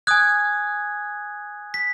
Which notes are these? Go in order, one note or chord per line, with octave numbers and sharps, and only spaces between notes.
G#5 D#6 F#6 G#6
B6